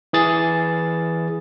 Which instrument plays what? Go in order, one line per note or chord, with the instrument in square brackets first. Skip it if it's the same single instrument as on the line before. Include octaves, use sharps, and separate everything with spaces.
[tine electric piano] E3 G#4 A6